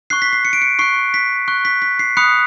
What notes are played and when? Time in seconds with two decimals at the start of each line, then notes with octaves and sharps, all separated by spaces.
0.10 C#6 F#6 C7
0.22 B6
0.33 C7
0.45 C#7
0.53 D7
0.62 C#7
0.79 C#6 F#6 C7
1.14 B6
1.48 C#6 F#6
1.65 B6
1.82 B6
1.99 C7
2.17 B5 D#6 F#6 C#7